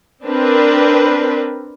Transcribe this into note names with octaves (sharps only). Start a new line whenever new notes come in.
C4 D4 A#4 B4